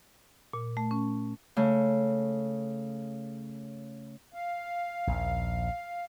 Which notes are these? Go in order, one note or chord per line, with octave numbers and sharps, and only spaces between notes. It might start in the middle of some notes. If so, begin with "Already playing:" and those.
A#2
A3
C#4
C#3 A3
F5
A#1 D#2